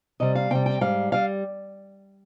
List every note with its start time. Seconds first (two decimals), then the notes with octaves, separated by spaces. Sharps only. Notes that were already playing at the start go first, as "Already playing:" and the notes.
0.20 C3 G3 D#5
0.35 F5
0.50 C3 G3 G5
0.66 G5
0.81 G#2 G3 F5
1.12 G3 F5